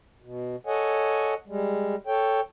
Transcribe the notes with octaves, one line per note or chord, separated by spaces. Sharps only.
B2
A4 C#5 D#5 F#5 G#5
G3 G#3
A4 C#5 G5